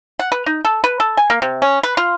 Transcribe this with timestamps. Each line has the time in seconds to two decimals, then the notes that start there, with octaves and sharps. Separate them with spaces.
0.19 F#5
0.32 B4
0.46 D#4
0.65 A4
0.84 B4
1.00 A4
1.17 G#5
1.30 A#3
1.42 C3
1.62 C#4
1.83 B4
1.97 F4